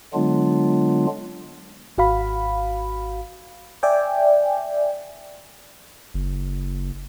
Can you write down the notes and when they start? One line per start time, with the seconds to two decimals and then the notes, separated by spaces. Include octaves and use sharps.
0.14 D3 F#3 G#3 B3 D4 F4
1.98 G#1 F#4 F5 B5
3.83 D5 E5 G5 G#5
6.14 F#1